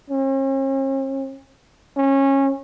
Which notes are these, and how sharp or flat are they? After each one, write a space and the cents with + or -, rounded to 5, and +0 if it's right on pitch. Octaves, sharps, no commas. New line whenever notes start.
C#4 -45
C#4 -20